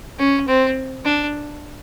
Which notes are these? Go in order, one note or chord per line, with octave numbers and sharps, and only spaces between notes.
C#4
C4
D4